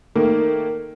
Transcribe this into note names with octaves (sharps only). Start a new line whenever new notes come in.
D#3 A3 A#3